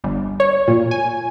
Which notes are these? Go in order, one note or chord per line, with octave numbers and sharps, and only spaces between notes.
G1
C#5
A#2
G#5